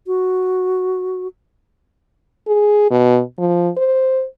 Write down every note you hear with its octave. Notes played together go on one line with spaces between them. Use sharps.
F#4
G#4
B2
F3
C5